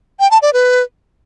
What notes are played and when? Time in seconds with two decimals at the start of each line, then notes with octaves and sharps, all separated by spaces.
0.20 G5
0.31 A5
0.42 D5
0.53 B4